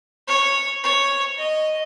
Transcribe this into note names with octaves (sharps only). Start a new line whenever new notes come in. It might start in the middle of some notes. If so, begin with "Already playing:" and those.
C#5
C#5
D#5